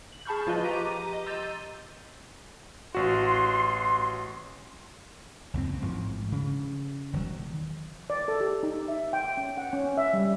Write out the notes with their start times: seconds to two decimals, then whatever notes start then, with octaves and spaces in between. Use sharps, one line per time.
0.12 F#7
0.25 G#4 A5 B5 C#6 F6 G6
0.47 F3 F4 B4 D#5
0.64 G4 A#5 D6 D#7
1.13 D#5
1.26 A#5 C6 E6 G6 A6 D#7
2.95 A1 F#4 C6
5.54 C#2 F#2 F3 C4
5.82 A1 G#2 F3
6.32 C#3
7.13 E1 D#3 F#3
8.10 D5
8.28 A4
8.41 G4
8.63 D#4
8.88 E5
9.13 G5
9.37 C#4
9.58 F#5
9.73 C#4
9.97 E5
10.13 G3